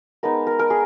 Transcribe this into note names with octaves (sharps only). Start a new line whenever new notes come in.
G#3 B3 D#4 A#4
A#4
A#4
G#4